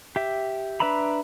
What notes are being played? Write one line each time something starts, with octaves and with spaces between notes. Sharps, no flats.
G4 E5
D4 B4 E5 A#5 B5